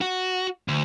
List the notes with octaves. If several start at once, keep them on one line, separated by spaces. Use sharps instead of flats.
F#4
D2